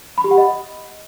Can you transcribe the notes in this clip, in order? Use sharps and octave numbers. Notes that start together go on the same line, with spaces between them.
B5
G4
F#5
D#5